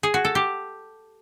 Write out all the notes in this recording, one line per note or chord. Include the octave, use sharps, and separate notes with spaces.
G#4
F#4
A4
G4